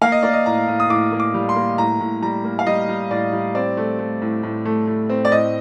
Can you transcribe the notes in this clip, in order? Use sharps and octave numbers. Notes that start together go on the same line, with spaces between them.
A#3 F5
D#5
A#3 D5
D#5
A2 A#5
A2
D#6
A2 D6
A#3
D6
G3
C6
A#3
A2 A#5
A2
G3 A#5
A#3
F5
G3 D#5
G3
A2 D5
G3
C4 D5
A3
A3
A2
A2
A3
A3
C4
D5
A2 D#5